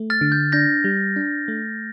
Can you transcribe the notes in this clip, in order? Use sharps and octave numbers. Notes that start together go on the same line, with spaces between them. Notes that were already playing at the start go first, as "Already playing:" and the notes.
Already playing: A3
F6 A6
D3
G6
D4 G6 A#6
G3
D4
A3